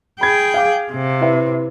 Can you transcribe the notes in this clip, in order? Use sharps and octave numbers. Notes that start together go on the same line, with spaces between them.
G#4 G5 B5 G#6
F5 D6
C3
E4 B4 E5